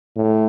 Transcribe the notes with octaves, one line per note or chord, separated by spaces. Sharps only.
A2